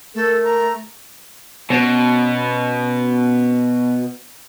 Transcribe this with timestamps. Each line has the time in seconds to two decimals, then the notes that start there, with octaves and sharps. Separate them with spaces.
0.15 A3 A4 A#4
0.44 A#5
1.70 B2 C#4 C5